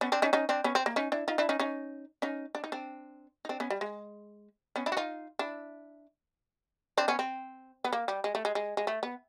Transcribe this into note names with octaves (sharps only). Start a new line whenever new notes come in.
B3 C#4
C4 D4
C#4 D#4
C#4 D#4
C4 D4
B3 C#4
C4
A#3
C#4 D#4
D4 E4
D#4 F4
D4 E4
C#4 D#4
C#4 D#4
C#4 D#4
D4
D#4
C4 D4
D#4
C4 D4
B3 C#4
G3
G#3
B3 C#4
D4 E4
F#4
D#4 F4
D4 E4
C4 D4
B3 C#4
C4
B3
A#3
G3
G#3
A3
G#3
G#3
G#3
A3
B3